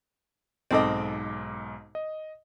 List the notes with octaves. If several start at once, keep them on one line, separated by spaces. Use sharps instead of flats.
B1 G#2 C4 A4 D#5 D6
D#5